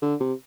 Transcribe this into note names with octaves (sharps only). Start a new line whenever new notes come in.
D3
C3